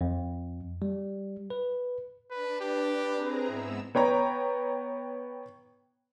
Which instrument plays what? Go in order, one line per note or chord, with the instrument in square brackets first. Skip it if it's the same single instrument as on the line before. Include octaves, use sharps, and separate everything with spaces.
[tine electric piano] F2
G3
B4
[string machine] D4 [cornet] B4
[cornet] G4 [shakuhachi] B4
[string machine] C4 G#4 A#5
[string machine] G#2 B3 E6 [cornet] E4
[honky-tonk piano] B3 C#5 G5 A#5